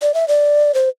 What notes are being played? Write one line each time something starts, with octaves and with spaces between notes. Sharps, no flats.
D5
E5
D5
C5